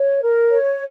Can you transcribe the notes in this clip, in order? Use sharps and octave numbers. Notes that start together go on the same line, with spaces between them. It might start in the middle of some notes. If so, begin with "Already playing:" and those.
Already playing: C#5
A#4
C#5